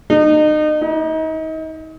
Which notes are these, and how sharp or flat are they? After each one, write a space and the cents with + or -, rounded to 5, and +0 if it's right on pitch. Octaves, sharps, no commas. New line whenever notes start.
D#4 -35
D#4 +30